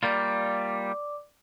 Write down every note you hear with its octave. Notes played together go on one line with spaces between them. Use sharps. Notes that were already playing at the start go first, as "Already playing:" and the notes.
G3 A#3 F4 D5 D6